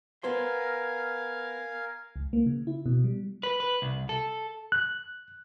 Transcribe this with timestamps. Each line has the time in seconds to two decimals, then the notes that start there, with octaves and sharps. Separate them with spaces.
0.23 B3 A#4 C5 F5 G#5 C6
2.16 C#2
2.33 A#3
2.46 C#3
2.67 E4
2.86 B2
3.04 G3
3.43 B4
3.60 B4
3.82 C2
4.09 A4
4.72 F#6